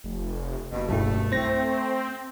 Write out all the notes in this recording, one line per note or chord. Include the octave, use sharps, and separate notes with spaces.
F1
F#1 G2 B2
B1 G2 A3 E4
C4 C5 A#6